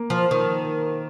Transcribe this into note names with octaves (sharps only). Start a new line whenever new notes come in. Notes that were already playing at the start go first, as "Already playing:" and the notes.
Already playing: A#3
F3
D#3